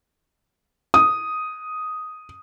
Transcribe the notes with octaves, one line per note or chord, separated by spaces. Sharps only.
D#6